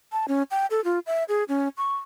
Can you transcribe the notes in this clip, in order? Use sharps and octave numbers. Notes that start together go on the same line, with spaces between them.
A5
C#4
G5
A4
F4
E5
G#4
C#4
C#6